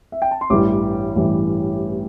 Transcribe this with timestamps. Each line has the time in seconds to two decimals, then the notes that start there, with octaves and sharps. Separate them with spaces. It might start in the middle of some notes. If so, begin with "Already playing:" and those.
0.12 E5
0.22 G5
0.31 A5
0.41 C6
0.50 A1 G2 E3 G3 D6
1.16 A1 G2 E3 G3